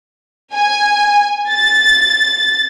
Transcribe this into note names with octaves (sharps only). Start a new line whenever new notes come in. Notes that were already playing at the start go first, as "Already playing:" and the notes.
G#5
A6